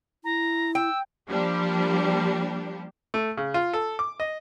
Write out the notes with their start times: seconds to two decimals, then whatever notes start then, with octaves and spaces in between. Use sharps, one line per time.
0.24 E4 A#5
0.75 G5 E6
1.29 F3 G3 A#3 D4 G4
3.14 A3
3.38 C#3
3.54 F4
3.73 A4
3.99 D6
4.20 D#5